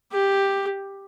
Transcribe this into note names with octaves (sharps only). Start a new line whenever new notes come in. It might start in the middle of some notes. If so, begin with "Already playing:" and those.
G4